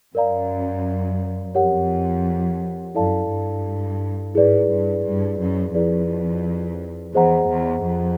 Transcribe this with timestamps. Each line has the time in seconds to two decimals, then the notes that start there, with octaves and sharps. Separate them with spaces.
0.14 F#2 A#4 D5 F5 A#5
1.54 F2 G4 A#4 C#5 F#5
2.95 F#2 E4 A4 D5 F5 A5
3.30 G2
4.34 G#2 E4 G#4 B4 D5
4.69 G2
5.04 G2
5.40 F#2
5.74 F2 E4 G#4 B4 D5
7.14 E2 G#4 C5 D#5 F#5 A#5
7.50 E2
7.85 F2